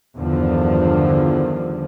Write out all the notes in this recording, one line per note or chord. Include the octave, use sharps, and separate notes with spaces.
E2 G2 D3 D#3 F3